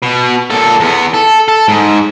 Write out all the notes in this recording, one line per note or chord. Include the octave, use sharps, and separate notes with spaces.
B2
A#2 A4
E2 B3
A4
A4
G#2